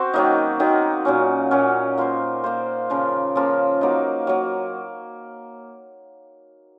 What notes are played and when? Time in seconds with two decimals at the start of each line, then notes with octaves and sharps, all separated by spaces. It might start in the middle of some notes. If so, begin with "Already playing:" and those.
Already playing: C4 F#4 C5
0.14 D#3 F#3 A#3 D#4
0.59 D#3 F#3 A#3 D#4
1.05 A#2 F#3 C#4
1.51 A#2 F#3 C#4
1.98 A#3 F4 C5
2.44 A#3 F4 C5
2.90 C#3 F3 A#3 F4
3.35 C#3 F3 A#3 F4
3.81 F#3 A#3 D#4
4.27 F#3 A#3